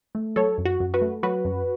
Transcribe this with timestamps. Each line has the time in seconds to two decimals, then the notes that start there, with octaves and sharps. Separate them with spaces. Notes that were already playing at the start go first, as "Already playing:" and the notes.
0.15 A3
0.36 F#3 A4 C#5
0.58 F#2
0.65 F#4
0.80 F#2
0.94 F#4 B4
1.02 A3
1.23 F#3 F#4 B4
1.45 F#2